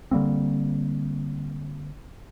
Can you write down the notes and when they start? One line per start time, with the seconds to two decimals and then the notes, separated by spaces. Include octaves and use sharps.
0.11 D3 G3 A#3 C4